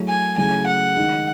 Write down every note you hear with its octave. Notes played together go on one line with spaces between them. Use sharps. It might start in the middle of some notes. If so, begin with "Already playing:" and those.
Already playing: F#3 A3 E4 G#4
G#5
C#3 F#3 A3 E4 G#5
F#5
D#3 G#3 D#4